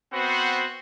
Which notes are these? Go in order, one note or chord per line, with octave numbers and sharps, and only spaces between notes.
B3 C4 F#4 C5 F#5